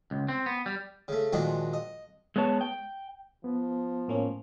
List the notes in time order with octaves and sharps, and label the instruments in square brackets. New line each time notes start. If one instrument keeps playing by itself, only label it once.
[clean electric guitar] C#2
C4
B3
G3
[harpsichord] C#3 A3
A#2 D#3 F3 G#3 D4 F#4
D#5
[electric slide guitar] G#3 B3 C#5 A5
G5
[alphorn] F3 [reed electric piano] B3
[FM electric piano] A2 A#3 C#4